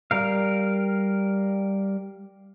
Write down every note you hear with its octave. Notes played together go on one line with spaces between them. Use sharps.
G3 A#4 F5